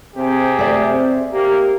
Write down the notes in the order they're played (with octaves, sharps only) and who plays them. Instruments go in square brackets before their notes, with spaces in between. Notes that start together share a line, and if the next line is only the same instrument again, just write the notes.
[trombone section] C3 G4 G#4 [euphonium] C4
[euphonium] A3 [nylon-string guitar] C5 D5 E5
[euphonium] C4
[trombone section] A#3 [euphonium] G4